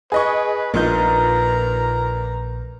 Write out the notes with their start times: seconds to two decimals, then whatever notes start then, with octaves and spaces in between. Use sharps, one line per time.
0.12 G#4 B4 D#5 C#6
0.74 A#1 A#2 D#4 A#4 B4 A#5 G6